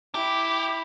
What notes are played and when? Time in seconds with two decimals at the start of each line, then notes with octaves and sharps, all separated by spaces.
0.15 E4 G4